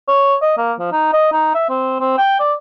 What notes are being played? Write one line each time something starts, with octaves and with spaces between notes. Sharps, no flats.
C#5
D#5
A#3
F3
D#4
D#5
D#4
E5
C4
C4
G5
D5